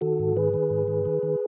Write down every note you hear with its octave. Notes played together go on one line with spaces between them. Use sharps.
D#3 F#4 A4
G#2
D#3 G#4 B4
D#3
G#2
D#3
D#3
D#3